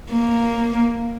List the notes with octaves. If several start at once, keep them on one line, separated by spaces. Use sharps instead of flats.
A#3